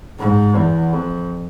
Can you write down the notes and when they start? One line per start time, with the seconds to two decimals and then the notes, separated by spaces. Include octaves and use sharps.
0.19 G#2
0.56 E2
0.92 F2